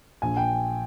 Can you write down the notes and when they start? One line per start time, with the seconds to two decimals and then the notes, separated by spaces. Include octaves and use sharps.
0.22 A#1 G#5
0.37 G5